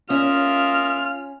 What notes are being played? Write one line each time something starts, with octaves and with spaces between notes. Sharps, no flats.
A#3 C#4 F4 D#5 E5 F6